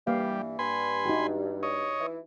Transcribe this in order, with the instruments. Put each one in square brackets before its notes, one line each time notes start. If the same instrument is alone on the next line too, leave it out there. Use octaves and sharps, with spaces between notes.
[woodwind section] G2 E3 [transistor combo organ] G3 [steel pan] A#3 F5
[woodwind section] G2 [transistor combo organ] G#5 B5 C6
[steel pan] D#4 F#4 G4
[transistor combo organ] C#5 D#5
[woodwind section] E3 E4